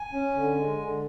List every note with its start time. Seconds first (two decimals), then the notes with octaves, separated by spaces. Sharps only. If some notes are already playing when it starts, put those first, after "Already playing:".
Already playing: G#5
0.13 C#4
0.35 D3
0.57 G#3
0.80 D3